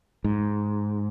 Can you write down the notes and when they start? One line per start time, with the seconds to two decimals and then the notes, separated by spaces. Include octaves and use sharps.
0.24 G#2